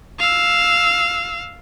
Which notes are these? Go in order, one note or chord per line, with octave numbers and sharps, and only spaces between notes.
F5 E6